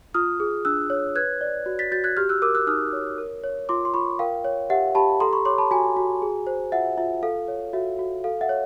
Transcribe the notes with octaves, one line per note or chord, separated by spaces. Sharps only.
F4 D#6 F6
G#4
D4 E6 F#6
C#5
B4 F#6 G#6
D5
F#4
A6 B6
F#4 G6 A6
F#6 G#6
G4 F6 G6
E6 F#6
A#4 D6 E6
E6 F#6
D#4 D#6 F6
C#5
A#4
C#5
F4 C6 D6
C6
F4 B5 C#6
A#4 F5 G5
C#5
G4 E5 F#5
G4 A5 B5
A4 A#5 C6
B5 C#6
C#5 C6 D6
A5 B5
F#4 G#5 A#5
F#4
G#4
C5
F4 E5 F#5
F4 E5
A4 F5
C#5
F#4 E5
F#4
A4 F5
E5 F#5
C#5